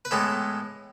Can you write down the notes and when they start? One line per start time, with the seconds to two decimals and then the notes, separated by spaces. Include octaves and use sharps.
0.05 B4
0.11 A2 E3 G#3 B3 A4